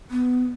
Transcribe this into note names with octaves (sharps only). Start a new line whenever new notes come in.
B3